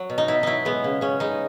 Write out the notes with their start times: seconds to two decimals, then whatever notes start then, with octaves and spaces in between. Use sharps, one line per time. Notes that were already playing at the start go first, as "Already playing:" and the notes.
Already playing: F#3
0.10 B2
0.18 D#4
0.28 B2 E4
0.43 F#3 D#4 E4
0.65 G#3 B3
0.84 C#3
1.01 C#3 C#4
1.20 G#3 D#4